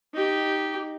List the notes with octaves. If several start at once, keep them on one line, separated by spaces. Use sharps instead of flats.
D#4 G4